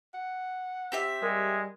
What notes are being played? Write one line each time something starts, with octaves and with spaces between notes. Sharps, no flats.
F#5
C4 G4 E5
G3 G#3 A#4